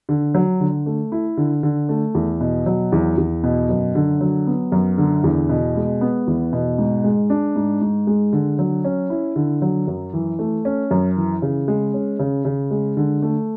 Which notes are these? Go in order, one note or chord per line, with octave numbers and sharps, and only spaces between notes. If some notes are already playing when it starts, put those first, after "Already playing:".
D3
F#3
D3
A3
E4
D3
D3
A3
E2
B2
F#3
E2
E2
B2
F#2
D3
F#3
B3
F#2
D3
E2
B2
G#3
B3
E2
B2
G#2
G#3
D4
G#2
G#2
G#3
D3
F#3
C#4
E4
D3
F#3
F#2
E3
A3
C#4
F#2
E3
C#3
G#3
C#4
C#3
C#3
G#3
D3
A3